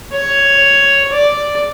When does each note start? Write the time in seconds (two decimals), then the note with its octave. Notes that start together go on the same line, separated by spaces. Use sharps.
0.13 C#5
1.12 D5